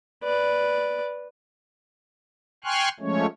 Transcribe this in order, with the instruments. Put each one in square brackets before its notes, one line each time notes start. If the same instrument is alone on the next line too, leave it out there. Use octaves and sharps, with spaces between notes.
[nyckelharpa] B4 D5
[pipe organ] G5 G#5 C6 C#6 F6 F#6
F3 G#3 A3 C#4 C#5